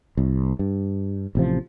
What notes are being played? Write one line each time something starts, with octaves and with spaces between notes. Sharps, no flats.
C2
G2
A1 C3 F3